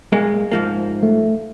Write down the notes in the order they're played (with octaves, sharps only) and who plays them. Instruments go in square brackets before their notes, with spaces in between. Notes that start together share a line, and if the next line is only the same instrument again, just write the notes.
[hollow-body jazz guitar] A#2 G#3 A#3
G#2 F3 A#3
[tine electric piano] A3